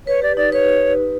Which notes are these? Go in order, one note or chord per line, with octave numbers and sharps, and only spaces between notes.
B4 C#5
G4 D5
D#4 D5
B4 C#5